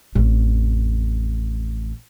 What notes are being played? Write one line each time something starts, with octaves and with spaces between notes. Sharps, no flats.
A1 F2